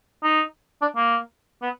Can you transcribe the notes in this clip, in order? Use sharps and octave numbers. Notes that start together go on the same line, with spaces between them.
D#4
D4
A#3
B3